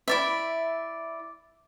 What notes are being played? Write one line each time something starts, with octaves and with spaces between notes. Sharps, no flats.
E4 D5 E5